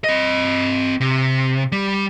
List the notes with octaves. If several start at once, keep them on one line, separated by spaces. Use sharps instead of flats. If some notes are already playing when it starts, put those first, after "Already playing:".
C4 D#5
C3
G3